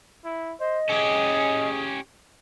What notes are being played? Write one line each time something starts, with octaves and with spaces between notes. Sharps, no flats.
E4
C5 D#5
C#4 G4 G#4